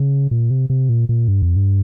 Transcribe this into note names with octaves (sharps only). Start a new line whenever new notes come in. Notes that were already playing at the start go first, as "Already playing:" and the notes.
Already playing: C#3
A#2
C3
C3
A#2
A#2
G2
F2
G2